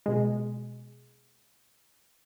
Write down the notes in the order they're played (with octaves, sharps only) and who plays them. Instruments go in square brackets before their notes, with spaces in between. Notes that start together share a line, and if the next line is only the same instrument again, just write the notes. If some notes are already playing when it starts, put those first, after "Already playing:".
[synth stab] B2 G#3